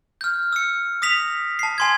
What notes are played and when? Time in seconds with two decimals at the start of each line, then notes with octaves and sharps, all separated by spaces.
0.21 F6 G6
0.53 E6 C#7
1.02 D#6 A#6 B6 F7
1.59 A5 C7
1.78 G#5 C6 G#6